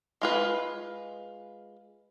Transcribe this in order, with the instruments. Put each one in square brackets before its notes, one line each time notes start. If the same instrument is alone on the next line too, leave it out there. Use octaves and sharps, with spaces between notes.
[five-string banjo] G#3 F4 B4